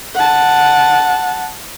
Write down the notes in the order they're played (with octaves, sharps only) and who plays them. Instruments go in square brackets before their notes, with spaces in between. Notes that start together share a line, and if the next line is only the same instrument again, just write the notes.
[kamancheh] F#5 A5